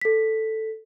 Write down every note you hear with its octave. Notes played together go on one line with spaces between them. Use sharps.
A4 B6